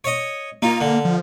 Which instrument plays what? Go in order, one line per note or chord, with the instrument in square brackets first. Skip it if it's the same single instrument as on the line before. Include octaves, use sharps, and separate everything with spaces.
[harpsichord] C#5 D#5
[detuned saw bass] A#3 [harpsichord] D#4 F4
[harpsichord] D3
[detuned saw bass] F3